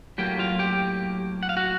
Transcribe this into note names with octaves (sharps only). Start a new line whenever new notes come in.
A2 F#3 A#3 G4 G5
F4 F5
G4 G5
F#5
F5
F#4 F#5